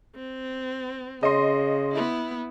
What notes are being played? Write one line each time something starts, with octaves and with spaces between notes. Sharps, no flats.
C4
C#3 D#5 C6
B3 E4